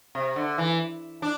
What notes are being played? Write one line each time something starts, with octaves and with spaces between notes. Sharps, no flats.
C3
D3
E3
D4